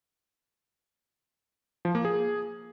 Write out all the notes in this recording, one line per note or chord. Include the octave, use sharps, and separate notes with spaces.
F3
A#3
G#4